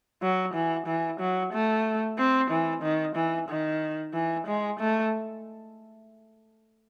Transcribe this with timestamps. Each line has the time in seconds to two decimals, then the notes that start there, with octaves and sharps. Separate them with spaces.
0.22 F#3
0.54 E3
0.87 E3
1.20 F#3
1.53 A3
2.18 C4
2.51 E3
2.83 D#3
3.16 E3
3.49 D#3
4.14 E3
4.47 G#3
4.79 A3